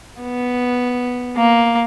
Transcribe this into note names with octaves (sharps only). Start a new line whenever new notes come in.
B3
A#3